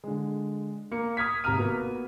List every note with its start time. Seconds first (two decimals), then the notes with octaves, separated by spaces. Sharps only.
0.04 D3 G#3
0.91 A#3 C#7
1.17 D#6 F6 G#6 B6
1.44 G#1 C3 A#5 D#6 F6 D#7
1.58 A#3 B3 F#4